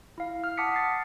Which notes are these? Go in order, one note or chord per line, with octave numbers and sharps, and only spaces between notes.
E4 F5
F6
F#5 A5 D6 D#6 B6 C#7
A6 C7